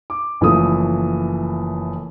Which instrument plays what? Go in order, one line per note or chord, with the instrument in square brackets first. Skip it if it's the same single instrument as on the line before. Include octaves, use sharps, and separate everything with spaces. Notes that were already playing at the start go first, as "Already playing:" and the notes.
[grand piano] D6
F#1 E3 F3 A3 D#6